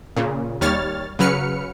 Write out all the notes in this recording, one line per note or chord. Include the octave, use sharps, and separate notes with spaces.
A#2 C#3
D#2 G3 C#5 F6 A6
C#3 F#3 B4 F6 C#7